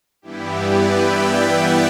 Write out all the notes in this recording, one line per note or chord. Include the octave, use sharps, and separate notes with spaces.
G2 E3 G3 B3 E4 G4
B4 D5
E5 G5
D5 F#5